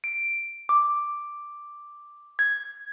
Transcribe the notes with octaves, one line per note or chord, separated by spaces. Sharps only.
D7
D6
G#6